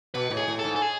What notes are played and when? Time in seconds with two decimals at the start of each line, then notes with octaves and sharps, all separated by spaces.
0.14 B2 B4
0.30 A2
0.37 G#4
0.48 A2
0.59 A4
0.64 G#2
0.76 A4
0.82 G#4